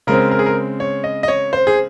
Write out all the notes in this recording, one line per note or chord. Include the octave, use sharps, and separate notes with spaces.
C#3 G#3 C4 A#4
A#4
G#4
A#4
C#5
D#5
D#5
C#5
C5
G#4